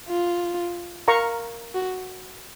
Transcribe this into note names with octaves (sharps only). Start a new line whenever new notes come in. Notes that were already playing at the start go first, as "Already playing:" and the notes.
F4
A#4 F5 A#5 C#6
F#4